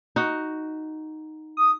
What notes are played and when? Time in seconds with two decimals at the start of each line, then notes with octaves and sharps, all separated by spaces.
0.16 D#4 F#4
1.57 D#6